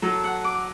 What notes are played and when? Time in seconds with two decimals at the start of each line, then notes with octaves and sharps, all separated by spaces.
0.02 F#3 A4
0.24 F#5
0.44 D6